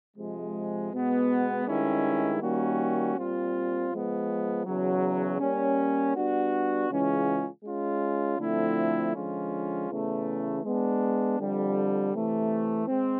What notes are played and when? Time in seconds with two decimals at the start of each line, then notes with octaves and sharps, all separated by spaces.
0.16 C3 F3 G#3
0.91 B2 G#3 B3
1.66 G2 D#3 G#3 C#4 E4
2.41 D#3 G3 A#3 C#4 F#4
3.15 A#2 G3 C4 F4
3.90 F3 G#3 B3
4.65 E2 C#3 F#3
5.40 G3 A#3 C#4
6.15 G3 B3 D4 F#4
6.89 C#3 E3 G#3 C#4 F4
7.64 G#3 C#4 F4
8.39 D3 F3 A3 C4 E4
9.14 D3 F3 G#3 C#4 F4
9.88 E2 C#3 E3 A3
10.63 G#3 B3 D4
11.38 F2 D3 G3
12.13 C3 E3 A3
12.87 G#3 C4